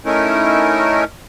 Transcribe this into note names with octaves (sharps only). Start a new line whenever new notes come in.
A3 C#4 D#4 E4 A#4